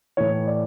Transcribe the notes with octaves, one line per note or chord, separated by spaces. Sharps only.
A2 E3 C#5
D5